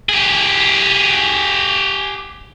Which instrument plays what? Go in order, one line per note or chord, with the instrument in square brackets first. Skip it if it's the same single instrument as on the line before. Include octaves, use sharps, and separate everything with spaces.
[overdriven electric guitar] G4 G#4